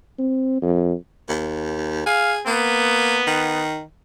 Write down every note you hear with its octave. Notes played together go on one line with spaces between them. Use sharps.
C4
F2
D#2
G#4 F5
A#3 B3
D#3